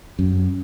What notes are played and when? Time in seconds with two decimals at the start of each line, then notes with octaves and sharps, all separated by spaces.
0.19 F#2